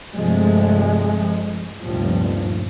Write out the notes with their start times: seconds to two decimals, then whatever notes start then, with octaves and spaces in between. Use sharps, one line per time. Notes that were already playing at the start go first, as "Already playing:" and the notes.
0.14 G2 C3 F3 G#3 A3
1.81 F1 D2 G2 A#2 F3